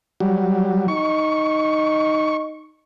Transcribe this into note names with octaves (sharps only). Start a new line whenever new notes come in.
F#3 G3
D#4 C#6